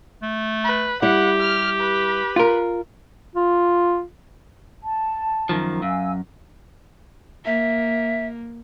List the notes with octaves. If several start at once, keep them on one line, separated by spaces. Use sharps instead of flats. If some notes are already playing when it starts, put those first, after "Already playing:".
A3
B4
G3 E4 G4 F#5
F6
B4
F4 A#4
F4
A5
F#2 D#3 F3
F#2 F5 G#5 E6
A#3 E5